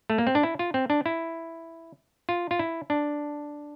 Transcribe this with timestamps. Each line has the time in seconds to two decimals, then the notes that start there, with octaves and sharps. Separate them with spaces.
0.10 A3
0.18 A#3
0.27 C4
0.35 D4
0.43 E4
0.59 F4
0.74 C4
0.90 D4
1.06 E4
2.29 F4
2.51 F4
2.59 E4
2.90 D4